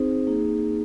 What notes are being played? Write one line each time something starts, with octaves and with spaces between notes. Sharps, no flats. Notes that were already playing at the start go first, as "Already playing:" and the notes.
Already playing: C4 D#4 G#4 C5
A#3 D#4 G#4